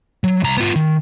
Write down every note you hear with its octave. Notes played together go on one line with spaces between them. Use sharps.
F#3
C2 A#5
B3 F4
D#3